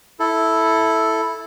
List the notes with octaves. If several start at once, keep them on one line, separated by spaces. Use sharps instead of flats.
E4 A4